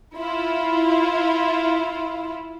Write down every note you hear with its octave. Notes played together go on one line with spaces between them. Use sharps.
E4 F4